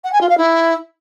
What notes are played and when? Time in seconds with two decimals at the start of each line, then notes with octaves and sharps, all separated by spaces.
0.04 F#5
0.12 G#5
0.20 F4
0.29 F5
0.37 E4